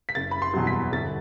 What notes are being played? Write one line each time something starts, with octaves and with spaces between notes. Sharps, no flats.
B6
F#1 A6
B5
C6
E2 B2 F#3
B6
G1 A6